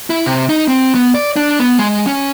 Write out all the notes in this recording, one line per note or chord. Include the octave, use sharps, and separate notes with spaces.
E4
C3
D#4
C4
B3
D5
D4
B3
G#3
C#4